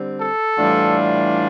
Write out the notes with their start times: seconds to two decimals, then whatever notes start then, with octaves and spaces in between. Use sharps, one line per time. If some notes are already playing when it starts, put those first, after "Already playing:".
Already playing: D3 G3 C4
0.20 A4
0.58 A2 E3 G3 D4 F4